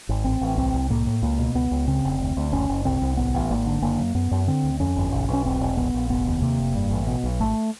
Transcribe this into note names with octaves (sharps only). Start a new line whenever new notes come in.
G#1
A1 C4
A1
C2 C4
C2
A2 A#3
A2
C#2 A#3
B2
C#2 B3
C#2
C#3 C4
F1
D2
D2
F#1 C#4
F#1
C2 C4
C2
A1 B3
A1
G#1 A#3
D3
F#1 A#3
F#2
F#2 B3
F#2
D3 C4
D2
F2 C#4
G1
B1
B1 C#4
E1 C4
E1
A#1 B3
A#1
F1 B3
D#2
C3 A#3
F1
G2
A1
B2
B1
G#1 A3